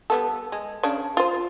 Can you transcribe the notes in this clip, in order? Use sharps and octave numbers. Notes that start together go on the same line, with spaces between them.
G3 B3 A4
G#3
C#3 D4
F4 C5